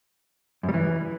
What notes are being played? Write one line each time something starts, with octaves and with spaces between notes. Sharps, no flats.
F#2
G3
E3